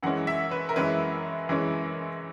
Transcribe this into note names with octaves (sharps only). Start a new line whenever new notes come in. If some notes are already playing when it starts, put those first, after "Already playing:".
F#2 E3 G#3 C#4 F#5
E5
B4
A#4
F#2 E3 G#3 C#4 B4
F#2 E3 G#3 C#4